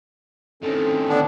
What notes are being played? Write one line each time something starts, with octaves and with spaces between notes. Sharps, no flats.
A2 D#3 C4 C#4 A4
D3 B3 D4